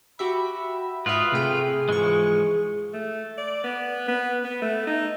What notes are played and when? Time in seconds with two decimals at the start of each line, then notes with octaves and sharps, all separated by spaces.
0.19 F#4 G4 E5 B5
1.06 G#2 F4 F#4 B4 E5 D#6
1.32 C3 A3 G#4 G5
1.89 G#2 E3 F3 G#3 C#6
2.93 A3
3.38 D5
3.64 B3
4.08 B3
4.44 B3
4.62 A3
4.87 D#4